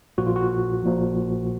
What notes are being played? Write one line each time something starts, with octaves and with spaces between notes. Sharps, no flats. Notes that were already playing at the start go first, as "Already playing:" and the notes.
A#1 A#2 F3 F#4
F4
F#4
A#1 A#2 F3